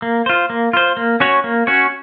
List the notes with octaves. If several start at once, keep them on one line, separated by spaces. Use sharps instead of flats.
A#3
F4 C5
A#3
F4 C5
A#3
C#4 F#4 C#5
A#3
C#4 F#4 C#5